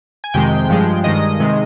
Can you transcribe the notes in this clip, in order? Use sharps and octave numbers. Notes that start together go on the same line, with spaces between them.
G#5
F2 C3 D#3 G#3 G5
G2 F3 G#3
G2 D#3 G#3 D#5
C3 D#3 G#3